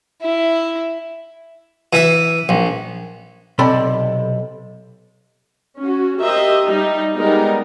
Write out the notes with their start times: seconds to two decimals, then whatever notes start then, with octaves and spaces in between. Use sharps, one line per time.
0.22 E4
1.93 E3 E5
2.49 A#1
3.59 B1 C3 A4 D5 B5
5.78 C#4 F#4
6.21 G4 A#4 C5 D#5 E5
6.66 G3 D#4
7.16 G3 G#3 B3 D#4 A#4